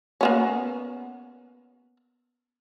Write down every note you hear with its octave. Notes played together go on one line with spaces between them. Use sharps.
A#3 B3 C#4